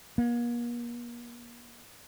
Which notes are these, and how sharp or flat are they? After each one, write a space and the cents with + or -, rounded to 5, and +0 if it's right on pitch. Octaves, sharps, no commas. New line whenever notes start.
A#3 +40